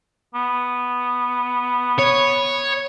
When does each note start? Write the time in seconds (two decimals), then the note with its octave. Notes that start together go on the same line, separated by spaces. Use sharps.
0.35 B3
1.98 C#5